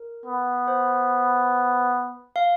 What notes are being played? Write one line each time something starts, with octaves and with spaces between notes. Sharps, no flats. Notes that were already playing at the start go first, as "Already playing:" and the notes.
Already playing: A#4
B3
C5
F5